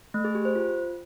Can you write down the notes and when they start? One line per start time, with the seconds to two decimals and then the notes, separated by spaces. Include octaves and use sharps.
0.14 A3
0.25 G#4
0.35 G4
0.45 C5
0.55 F4